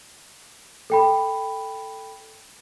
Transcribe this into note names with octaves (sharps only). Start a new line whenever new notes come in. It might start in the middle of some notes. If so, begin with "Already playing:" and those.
A4 G5 B5